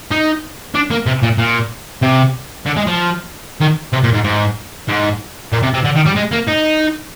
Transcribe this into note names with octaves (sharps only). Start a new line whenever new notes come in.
D#4
D4
A#3
C3
A#2
A#2
C3
D3
G#3
F3
D#3
C3
A#2
G#2
G#2
G#2
A#2
C3
C3
D3
D#3
G3
G#3
A#3
D#4